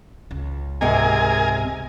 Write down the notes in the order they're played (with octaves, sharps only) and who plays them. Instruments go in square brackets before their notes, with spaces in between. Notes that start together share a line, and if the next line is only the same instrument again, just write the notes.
[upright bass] C#2
[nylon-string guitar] G#2 C3 G5 [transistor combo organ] G#4 A#4 G#5